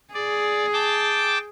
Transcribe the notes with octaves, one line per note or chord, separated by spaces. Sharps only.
G#4 D5
G5 A5 D6